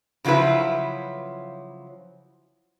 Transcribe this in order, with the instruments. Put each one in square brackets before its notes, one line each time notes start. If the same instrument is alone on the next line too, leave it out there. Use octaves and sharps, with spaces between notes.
[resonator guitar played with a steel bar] C#3 F3 F#3 E4 B4